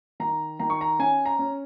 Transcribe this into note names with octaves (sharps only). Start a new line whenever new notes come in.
D#3 A#5
D#3 A#5
C#6
A#5
C#4 G#5
A#5
C#4